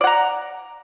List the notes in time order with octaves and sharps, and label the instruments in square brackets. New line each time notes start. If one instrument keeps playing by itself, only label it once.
[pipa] D5
F#5
A#5